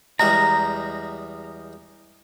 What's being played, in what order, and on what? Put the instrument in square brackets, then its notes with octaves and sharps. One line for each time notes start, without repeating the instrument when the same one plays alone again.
[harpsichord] E2 G3 G#3 [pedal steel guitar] A#5